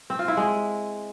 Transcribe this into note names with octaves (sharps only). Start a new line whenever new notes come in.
C4
F4
E4
G#3